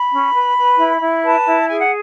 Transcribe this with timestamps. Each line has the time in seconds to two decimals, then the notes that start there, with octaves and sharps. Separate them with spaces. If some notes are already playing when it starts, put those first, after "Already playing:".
Already playing: B5
0.12 C#4
0.34 B4
0.57 B4
0.78 E4
1.01 E4
1.23 B4 A5
1.46 E4
1.69 G#4 G#5
1.80 F#5